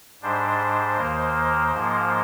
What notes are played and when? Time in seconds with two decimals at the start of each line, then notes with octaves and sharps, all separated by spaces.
0.22 G#2 G3 D4 C5
0.97 D#2 D#3 A#3
1.72 G#2 F3 A#3